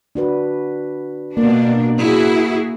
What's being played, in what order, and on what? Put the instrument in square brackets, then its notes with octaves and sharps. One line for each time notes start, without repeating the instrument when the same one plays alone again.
[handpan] D4 F#4 B4
[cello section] B2 D4 [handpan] A#3
[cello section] E4 F#4 G#4